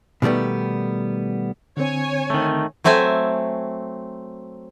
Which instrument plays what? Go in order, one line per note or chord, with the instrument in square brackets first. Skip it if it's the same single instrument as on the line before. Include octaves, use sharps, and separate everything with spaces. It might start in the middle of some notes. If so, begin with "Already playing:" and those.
[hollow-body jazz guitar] B2 D#3 G3 A3 B3
[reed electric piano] D3 C4 [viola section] C#5 G#5
[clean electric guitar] D#3 A3
[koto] F#3 A3 C4 E5 G#5